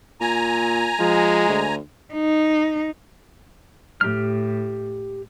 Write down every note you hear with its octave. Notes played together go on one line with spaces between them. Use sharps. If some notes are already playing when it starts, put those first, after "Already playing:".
A#2 G#5 A#5
F3 G#3
D2
D#4
A2 G4 F6